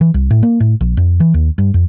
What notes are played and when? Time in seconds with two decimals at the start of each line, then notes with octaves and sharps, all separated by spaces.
0.01 E3
0.14 C2
0.31 A2
0.43 A#3
0.60 A2
0.81 A#1
0.97 F2
1.20 E3
1.34 D#2
1.58 G2
1.74 F2